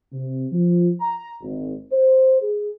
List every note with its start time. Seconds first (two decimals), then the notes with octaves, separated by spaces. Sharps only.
0.13 C3
0.51 F3
1.01 A#5
1.42 G#1
1.92 C5
2.42 G#4